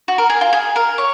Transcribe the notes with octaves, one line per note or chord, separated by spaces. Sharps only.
F#4
A#4
G#4
F4
G#4
A#4
C#5